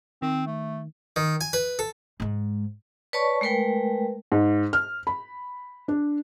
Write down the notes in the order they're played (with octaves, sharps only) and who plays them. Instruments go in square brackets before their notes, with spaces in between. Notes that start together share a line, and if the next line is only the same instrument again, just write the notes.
[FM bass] D#3 [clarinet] C4
[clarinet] A3
[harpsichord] D#3
G#5
B4
A4
[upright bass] G#2 G#3
[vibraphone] B4 C#5 D5 A5 B5 C#6
G#3 A3 A#4 B4 G5
[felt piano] G#2
F6
B5
D4